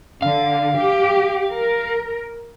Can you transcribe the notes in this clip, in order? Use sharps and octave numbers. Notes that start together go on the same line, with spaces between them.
D3 F5
G4
A#4